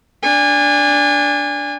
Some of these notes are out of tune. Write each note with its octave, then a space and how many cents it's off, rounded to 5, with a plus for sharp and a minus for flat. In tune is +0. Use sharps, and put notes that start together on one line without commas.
D4 -10 G#5 -30